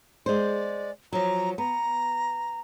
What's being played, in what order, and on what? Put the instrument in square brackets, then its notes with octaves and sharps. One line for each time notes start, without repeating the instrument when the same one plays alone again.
[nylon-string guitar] G#3 C5 [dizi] D5
[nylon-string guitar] F3 F#3 [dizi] A#5
[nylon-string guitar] B3 [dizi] A#5